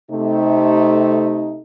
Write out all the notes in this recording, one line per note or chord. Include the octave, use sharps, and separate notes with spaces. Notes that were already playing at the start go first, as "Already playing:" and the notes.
C3 A3 D#4